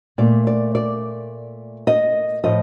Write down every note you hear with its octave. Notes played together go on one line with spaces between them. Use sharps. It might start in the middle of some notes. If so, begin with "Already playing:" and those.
A#2 A3 D5
D5
D5
D#5
A2 F3 A3 D#5